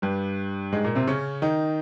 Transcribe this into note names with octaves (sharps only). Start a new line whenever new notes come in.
G2 G3
G#2 G#3
A#2 A#3
C3 C4
C#3 C#4
D#3 D#4